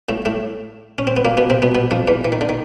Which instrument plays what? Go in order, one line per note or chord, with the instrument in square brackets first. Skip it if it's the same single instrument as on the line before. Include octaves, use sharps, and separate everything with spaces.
[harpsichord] A2 A3
A2 A3
C#4
C4
B3
A#2 A#3
B2 B3
C3 C4
B2 B3
B2 B3
F2 F3
E2 E3
E3
D#3
D3
D#3